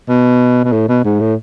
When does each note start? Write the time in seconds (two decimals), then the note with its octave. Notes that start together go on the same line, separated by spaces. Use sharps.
0.09 B2
0.64 B2
0.72 A2
0.89 B2
1.04 G#2
1.20 A2